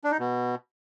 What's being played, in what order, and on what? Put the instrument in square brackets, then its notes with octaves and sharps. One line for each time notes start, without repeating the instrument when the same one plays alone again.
[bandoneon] D4
D#4
B2